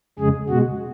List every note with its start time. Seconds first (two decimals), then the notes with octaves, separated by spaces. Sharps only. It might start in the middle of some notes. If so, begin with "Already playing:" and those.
0.19 F2 C#3 G#3 G#4
0.49 B2 G#3 F#4